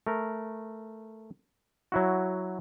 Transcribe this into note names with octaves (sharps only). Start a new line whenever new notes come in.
A3 A#4
F#3 E4 F#4